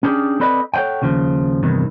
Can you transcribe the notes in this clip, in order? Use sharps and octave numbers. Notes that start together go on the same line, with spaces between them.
C#4 D4 G4 G#4
C4 A4 B4 D5 D#5
A4 C#5 D#5 F#5 G5
D#2 C#3 F3
E2 G2 C3 D#3